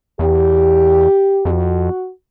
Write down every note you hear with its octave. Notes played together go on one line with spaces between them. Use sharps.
E2 G4
F2 F#4